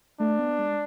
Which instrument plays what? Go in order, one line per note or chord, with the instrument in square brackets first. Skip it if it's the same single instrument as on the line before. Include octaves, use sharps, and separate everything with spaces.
[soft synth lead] A3 [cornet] D4
[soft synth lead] B3
G#3